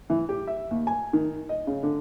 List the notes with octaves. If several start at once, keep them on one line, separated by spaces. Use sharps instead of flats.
E3
G4
E5
D#2
G#5
D#3
D#5
C#3
D3